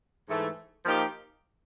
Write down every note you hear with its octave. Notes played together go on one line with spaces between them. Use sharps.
G#2 E3 A3
F3 A#3 D#4 G4